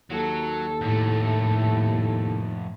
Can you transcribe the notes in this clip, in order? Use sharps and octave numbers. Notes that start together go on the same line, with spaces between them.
D#2 F#3 A4
F2 A2 A3